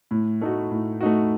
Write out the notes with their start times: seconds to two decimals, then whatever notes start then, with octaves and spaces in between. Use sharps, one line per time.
0.11 A2
0.41 A3 D#4 F#4
0.71 A2
1.01 A3 D#4 F#4